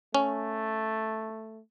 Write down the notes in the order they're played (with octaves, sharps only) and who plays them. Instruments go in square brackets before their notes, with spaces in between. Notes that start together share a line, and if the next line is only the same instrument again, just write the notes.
[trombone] A3 [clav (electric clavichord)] C#4